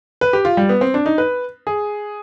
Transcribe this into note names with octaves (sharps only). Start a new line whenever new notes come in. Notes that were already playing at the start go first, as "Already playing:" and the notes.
B4
G4
F4
G3
B3
C4
D4
D#4
B4
G#4